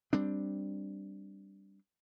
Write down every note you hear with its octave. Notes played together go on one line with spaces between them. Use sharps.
G3 C4 D4